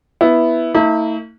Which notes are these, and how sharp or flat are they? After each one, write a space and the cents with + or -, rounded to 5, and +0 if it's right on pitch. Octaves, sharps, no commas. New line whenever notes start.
B3 +0 E4 +0
A3 +45 E4 -40